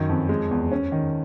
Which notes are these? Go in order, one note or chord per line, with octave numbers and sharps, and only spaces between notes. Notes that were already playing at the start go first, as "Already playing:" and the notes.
Already playing: F#2 D#3
F2
G#3
E2
C#4
D#3